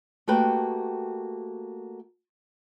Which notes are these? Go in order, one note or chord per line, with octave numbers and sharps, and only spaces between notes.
A3 A#3 F#4 G4 B4 G5